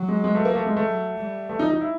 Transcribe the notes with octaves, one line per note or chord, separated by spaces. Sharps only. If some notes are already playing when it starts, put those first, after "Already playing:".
Already playing: F#3
G#3
G#3
A3
A#3
A3
G#3
A3
F#3
G3
A3
D#4
D#4
E4